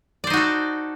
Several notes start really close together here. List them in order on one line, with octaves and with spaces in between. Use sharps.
D5 C5 D#4 F#4 A4